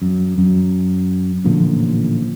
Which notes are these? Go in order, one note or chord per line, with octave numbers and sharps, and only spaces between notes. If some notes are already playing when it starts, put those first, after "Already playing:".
F#2
F#2
A1 A#2 D3 F3